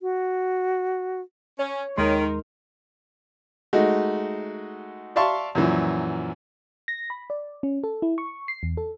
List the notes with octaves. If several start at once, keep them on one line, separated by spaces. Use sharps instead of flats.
F#4
C#4 C#5
D#2 D#3 G#3 D#4 A#4 C6
G#3 A3 D#4 F#4
D5 E5 F5 A5 C6 C#6
F#2 A#2 E3 F3
A#6
B5
D5
C#4
A4
E4
C#6
C7
E2
A4